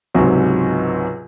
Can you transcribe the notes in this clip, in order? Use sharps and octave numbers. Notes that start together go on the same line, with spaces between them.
C#2 G#2 C3 F#3